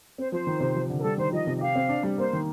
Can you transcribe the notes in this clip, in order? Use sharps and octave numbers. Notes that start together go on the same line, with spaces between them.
C4 C5
F3 C5
D#3
C3
F3
D3
A#4
G3 A4
D#3 C5
F3 D#5
C3
D#5
G4 F5
C4
D4
G3
A#3 C5
D#3